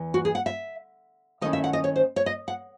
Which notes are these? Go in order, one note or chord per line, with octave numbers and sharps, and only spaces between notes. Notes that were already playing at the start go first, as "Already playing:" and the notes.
Already playing: E2 E3
F#4
G#4
F#5
E5
D#3 A3 C#4 E4 D#5
E5
F#5
D#5
C#5
C5
C#5
D#5
F#5